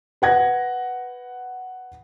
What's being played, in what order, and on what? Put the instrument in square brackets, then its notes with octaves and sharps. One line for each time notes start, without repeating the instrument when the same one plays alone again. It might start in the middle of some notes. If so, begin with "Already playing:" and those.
[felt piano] B4 F#5 G#6 A#6